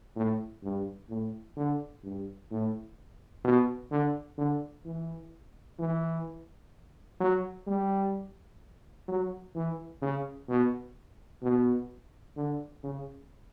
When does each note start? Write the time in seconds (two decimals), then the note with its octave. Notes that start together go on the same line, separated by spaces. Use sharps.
0.16 A2
0.63 G2
1.09 A2
1.57 D3
2.04 G2
2.51 A2
3.44 B2
3.91 D3
4.38 D3
4.85 E3
5.79 E3
7.20 F#3
7.67 G3
9.08 F#3
9.55 E3
10.02 C#3
10.48 B2
11.42 B2
12.37 D3
12.83 C#3